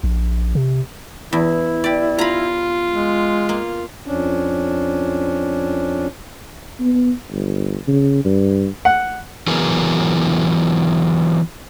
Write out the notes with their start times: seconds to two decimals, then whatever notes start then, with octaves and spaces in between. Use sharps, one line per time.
0.04 A#1
0.55 C3
1.33 E2 E4
1.84 G4 D5
2.18 F4 A#5 B5
2.92 G#3
3.49 A#3
4.06 F2 C#4 D4
6.80 B3
7.32 G1
7.88 C#3
8.25 G2
8.85 F#5
9.47 E3 F#3 B3 G#4 A#4